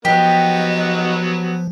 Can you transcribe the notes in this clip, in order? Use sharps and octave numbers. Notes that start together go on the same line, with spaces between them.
F3 F#3 B3 G4 D#5